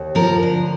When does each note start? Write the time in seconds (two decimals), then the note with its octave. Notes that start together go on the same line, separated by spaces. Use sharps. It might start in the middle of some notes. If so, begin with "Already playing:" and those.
Already playing: D#2
0.15 F3 A#4
0.43 D3